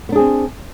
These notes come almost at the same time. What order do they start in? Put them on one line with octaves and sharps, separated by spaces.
B3 D4 G#4 C4